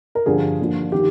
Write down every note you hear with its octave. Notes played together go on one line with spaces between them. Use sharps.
A#4
G2 D3 F3 G#4
D#2 D3 F3
D#3 G4